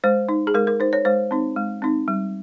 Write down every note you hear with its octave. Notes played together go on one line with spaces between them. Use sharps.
G#3 C5
D#4
G#4
G#3 A#4
A#4
D#4 C5
C#5
G#3 C5
C4 D#4
G#3
C4 D#4
G3